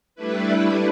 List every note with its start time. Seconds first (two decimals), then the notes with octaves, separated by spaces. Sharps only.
0.15 G3 A3 D4 E4 B4